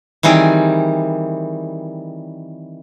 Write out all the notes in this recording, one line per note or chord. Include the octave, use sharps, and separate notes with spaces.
D#3 E3 G3 C4 G#4